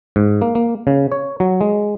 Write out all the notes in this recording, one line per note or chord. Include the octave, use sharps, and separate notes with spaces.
G#2
A#3
A#3
C#3
C#5
F#3
G#3